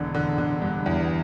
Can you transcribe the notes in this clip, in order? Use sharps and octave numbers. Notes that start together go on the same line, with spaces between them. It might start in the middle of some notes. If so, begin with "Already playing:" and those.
Already playing: E1 D3
D3
D3
G2
E2